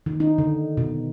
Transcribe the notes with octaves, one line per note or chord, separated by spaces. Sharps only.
D#3
D#4
D3
B2